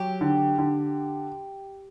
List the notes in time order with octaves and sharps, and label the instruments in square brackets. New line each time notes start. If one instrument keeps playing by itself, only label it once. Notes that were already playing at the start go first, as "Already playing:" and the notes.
Already playing: [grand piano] F#3 [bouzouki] G4
[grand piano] D3
D3